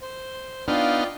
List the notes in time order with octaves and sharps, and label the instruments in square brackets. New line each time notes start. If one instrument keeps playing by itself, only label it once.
[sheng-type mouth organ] C5
[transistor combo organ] B3 D#4 F5 [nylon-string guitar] D4 [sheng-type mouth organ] F4 D5 G5